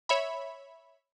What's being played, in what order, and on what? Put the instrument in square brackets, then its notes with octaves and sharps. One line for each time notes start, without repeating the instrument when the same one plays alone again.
[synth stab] C#5 E5 B5